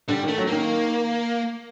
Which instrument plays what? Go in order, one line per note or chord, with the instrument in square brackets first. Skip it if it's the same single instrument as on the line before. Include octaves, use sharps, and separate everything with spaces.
[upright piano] D3 [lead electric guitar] G3
[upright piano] D#3
[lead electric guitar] A3
[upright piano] F#3
[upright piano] D#3 [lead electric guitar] A#3